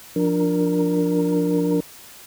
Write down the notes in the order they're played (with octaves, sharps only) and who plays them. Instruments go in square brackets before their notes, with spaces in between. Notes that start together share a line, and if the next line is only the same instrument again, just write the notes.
[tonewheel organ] F3 D4 A#4